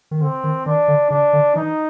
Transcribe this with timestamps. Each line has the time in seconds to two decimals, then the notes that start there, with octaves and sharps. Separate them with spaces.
0.11 D#3
0.21 D3 C4
0.44 D#3
0.66 D#3 D4
0.88 D3
1.10 C#3 D4
1.33 D3
1.55 E3 D#4